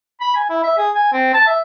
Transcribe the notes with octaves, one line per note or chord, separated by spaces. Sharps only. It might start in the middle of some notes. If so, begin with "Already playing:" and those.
B5
G#5
E4
E5
G#4
G#5
C4
A5
E5